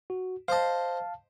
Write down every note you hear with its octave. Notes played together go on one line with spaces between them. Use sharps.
F#4
C5 D#5 F5 A5